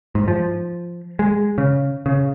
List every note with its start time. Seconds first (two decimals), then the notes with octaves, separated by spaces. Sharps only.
0.15 G#2
0.28 F3
1.19 G#3
1.58 C#3
2.06 C#3